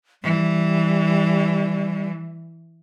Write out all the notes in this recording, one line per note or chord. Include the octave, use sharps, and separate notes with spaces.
E3 G3